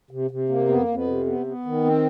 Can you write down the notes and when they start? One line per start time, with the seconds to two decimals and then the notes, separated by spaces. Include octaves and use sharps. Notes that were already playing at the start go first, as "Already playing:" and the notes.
0.11 C3
0.31 C3
0.49 A#3
0.68 F2 B3
0.88 F2
0.95 B3
1.07 C3
1.26 B3
1.46 B3
1.66 D#3
1.85 C4